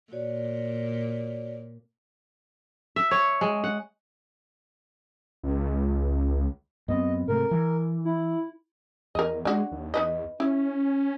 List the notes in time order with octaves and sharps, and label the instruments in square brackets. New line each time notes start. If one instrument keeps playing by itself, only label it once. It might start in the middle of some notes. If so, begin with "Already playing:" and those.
[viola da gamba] A#2 [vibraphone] F#4 C#5 D5
[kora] E5
C#5
G#3
F#5
[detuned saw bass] C#2
[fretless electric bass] F#2 B3 C4 [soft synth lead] D#5
[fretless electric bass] G#2 C3 A3 [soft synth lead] A#4
[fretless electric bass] E3
[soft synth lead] E4
[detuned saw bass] E2 [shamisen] A#4 D#5
[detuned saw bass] G#3 [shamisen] D4 F#4
[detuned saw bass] D#2
[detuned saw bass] E2 [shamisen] D#4 B4 D#5
[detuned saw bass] C#4 [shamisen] E4